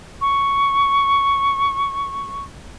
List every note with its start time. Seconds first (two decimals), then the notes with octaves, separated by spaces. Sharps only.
0.21 C#6